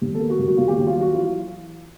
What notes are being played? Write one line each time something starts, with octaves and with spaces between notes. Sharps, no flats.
D#2
A#3 A4
F#4
D#2
F#4
D#2 F4
G4
F#4
D#2
F4
F#3 F#4
E3 F4